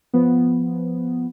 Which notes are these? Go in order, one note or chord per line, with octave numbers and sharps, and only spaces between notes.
F3 B3